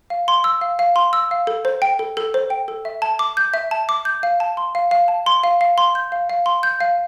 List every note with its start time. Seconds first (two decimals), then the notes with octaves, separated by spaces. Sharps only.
0.10 F5
0.28 C6
0.44 E6
0.61 F5
0.79 F5
0.96 C6
1.13 E6
1.31 F5
1.47 A4
1.65 C5
1.82 G5
1.99 A4
2.17 A4
2.34 C5
2.50 G5
2.68 A4
2.85 E5
3.02 A5
3.19 D6
3.37 G6
3.54 E5
3.71 A5
3.89 D6
4.05 G6
4.23 F5
4.40 A5
4.57 C6
4.75 F5
4.91 F5
5.08 A5
5.26 C6
5.44 F5
5.61 F5
5.78 C6
5.95 G6
6.12 F5
6.30 F5
6.46 C6
6.63 G6
6.80 F5